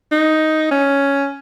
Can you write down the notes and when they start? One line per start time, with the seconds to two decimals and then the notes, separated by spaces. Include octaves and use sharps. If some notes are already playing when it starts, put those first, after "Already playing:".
0.11 D#4
0.71 C#4